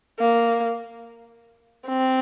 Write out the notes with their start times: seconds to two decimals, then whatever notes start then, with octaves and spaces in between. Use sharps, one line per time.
0.19 A#3
1.88 C4